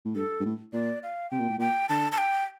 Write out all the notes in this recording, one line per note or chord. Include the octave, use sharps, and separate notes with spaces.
A2
G2 A4
G2
A2
A#2 D5
F5
C3 G5
A#2
A2
A#2 G5
D3 A5
A5
G5